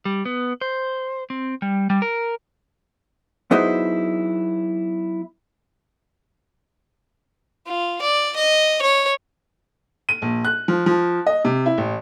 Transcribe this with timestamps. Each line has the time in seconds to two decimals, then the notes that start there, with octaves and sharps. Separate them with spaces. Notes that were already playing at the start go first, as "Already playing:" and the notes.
0.05 G3
0.25 B3
0.61 C5
1.30 C4
1.62 G3
1.90 G3
2.02 A#4
3.51 F#3 B3 D#4 E4 G#4 C5
7.67 F4
8.01 D5
8.36 D#5
8.82 C#5
10.09 D#7
10.22 A#1
10.45 F#6
10.68 F3
10.86 F3
11.27 D#5
11.45 C3
11.66 E4
11.78 A1